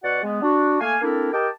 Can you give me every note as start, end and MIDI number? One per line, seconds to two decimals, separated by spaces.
0.04 0.22 47
0.04 0.22 66
0.04 0.22 74
0.04 0.22 78
0.23 0.40 56
0.23 0.40 59
0.42 0.80 62
0.42 0.80 66
0.81 0.98 57
0.81 0.98 58
0.81 0.98 77
0.81 0.98 80
1.02 1.32 58
1.02 1.32 60
1.02 1.32 62
1.02 1.32 64
1.02 1.32 69
1.02 1.32 70
1.33 1.48 67
1.33 1.48 70
1.33 1.48 75
1.33 1.48 79
1.33 1.48 81
1.33 1.48 86